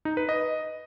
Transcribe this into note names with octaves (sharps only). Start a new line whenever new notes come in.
D#4
B4
D#5